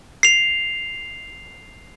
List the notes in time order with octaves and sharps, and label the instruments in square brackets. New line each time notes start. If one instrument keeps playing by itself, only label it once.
[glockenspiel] C7 F7